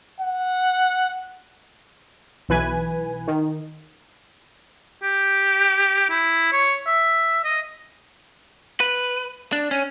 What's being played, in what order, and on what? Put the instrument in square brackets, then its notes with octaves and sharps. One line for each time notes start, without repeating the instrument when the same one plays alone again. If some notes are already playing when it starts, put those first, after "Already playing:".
[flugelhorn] F#5
[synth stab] B1 E3 B4 G#5
D#3
[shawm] G4
E4
C#5
E5
D#5
[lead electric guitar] B4
D4
C#4